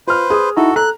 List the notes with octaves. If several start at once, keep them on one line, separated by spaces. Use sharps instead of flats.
F4 B4 C5 F6
G#4 D#6
D#4 E4 F#4 A4 A#5
A4 A#5 F#6